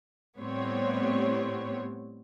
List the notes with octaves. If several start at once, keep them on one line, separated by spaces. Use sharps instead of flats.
A2 G3 B3 C4 C#5